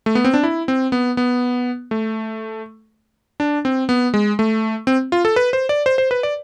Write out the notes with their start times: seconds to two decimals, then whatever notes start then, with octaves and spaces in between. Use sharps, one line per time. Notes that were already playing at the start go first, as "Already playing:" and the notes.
0.06 A3
0.15 B3
0.24 C4
0.34 D4
0.43 E4
0.68 C4
0.92 B3
1.17 B3
1.91 A3
3.40 D4
3.65 C4
3.89 B3
4.14 G#3
4.39 A3
4.87 C4
5.12 F4
5.25 A4
5.36 B4
5.53 C5
5.69 D5
5.86 C5
5.98 C5
6.11 B4
6.23 D5